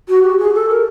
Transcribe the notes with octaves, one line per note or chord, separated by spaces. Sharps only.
F#4
G4
G#4
A4
A#4